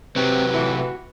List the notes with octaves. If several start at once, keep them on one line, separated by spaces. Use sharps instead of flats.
C3 F#3 C4 G4 B4
A2 E3 F#4